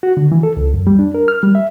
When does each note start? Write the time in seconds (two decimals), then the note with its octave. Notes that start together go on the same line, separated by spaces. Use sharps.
0.03 F#4
0.17 D3
0.32 E3
0.43 A4
0.57 C#2
0.74 F#2
0.87 G3
0.99 D4
1.14 A#4
1.28 F6
1.43 G3
1.55 E5